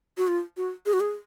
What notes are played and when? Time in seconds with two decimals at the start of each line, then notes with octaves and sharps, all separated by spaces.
0.18 F#4
0.28 F4
0.57 F#4
0.86 G#4
0.93 F#4
1.00 G#4